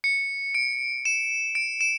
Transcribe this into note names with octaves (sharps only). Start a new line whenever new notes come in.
C#7
D7
E7
D7
E7